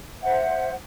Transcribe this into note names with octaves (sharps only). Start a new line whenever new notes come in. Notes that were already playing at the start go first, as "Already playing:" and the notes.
C5 E5 F#5